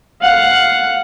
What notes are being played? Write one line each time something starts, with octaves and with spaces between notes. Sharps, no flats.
F5 F#5